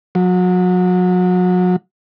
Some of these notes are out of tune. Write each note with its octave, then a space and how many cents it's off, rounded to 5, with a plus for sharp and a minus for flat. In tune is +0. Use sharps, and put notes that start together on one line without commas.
F#3 -30